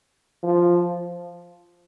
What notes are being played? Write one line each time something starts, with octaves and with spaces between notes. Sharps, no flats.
F3